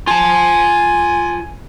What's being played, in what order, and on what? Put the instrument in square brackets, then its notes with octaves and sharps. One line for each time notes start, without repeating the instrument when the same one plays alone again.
[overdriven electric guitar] F4 A5 [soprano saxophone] G#5